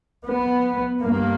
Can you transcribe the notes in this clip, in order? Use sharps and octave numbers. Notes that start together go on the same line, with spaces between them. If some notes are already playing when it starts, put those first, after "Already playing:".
B3
G2 A#3